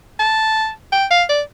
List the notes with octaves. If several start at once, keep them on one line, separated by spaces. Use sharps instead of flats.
A5
G5
F5
D5